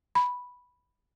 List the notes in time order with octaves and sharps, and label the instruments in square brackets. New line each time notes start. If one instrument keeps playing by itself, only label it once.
[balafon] B5